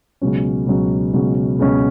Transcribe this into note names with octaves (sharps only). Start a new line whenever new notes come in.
C#2 B2 F#3 C#4
C#2 B2 F#3 C#4
C#2 B2 F#3 C#4
C#2 B2 F#3 C#4